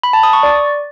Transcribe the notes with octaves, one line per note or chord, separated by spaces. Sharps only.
B5
A5
D#6
C#6
D5